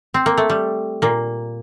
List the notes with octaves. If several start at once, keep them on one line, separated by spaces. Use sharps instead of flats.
C4
A#3
A3
G3
A#2 A#3